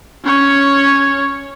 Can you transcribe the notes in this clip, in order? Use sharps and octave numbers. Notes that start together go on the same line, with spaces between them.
C#4 C#5